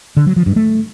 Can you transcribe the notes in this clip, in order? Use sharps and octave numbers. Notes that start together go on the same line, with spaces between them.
D3
F#3
F3
G2
A3